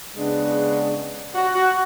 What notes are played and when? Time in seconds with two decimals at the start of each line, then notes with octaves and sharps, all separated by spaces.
0.14 C#3 G#3 B3 D4
1.34 F#4
1.55 F#4